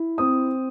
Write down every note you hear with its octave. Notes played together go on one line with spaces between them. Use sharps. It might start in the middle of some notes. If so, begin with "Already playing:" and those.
Already playing: E4
C4 D#6